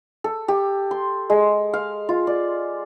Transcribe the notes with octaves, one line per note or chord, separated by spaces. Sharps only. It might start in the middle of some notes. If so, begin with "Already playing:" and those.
A4
G4
C6
G#3
F5
F4
D5